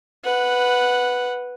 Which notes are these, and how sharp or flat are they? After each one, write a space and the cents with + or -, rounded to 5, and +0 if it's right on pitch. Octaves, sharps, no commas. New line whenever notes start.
B4 +0 F#5 -5